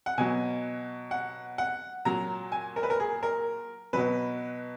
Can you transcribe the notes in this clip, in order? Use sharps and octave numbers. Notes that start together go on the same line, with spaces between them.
F#5
B2 F#3 G#5
F#5
F#5
A#2 F#3 A#5
G#5
A#4
B4
A#4
G#4
A#4
B2 F#3 B4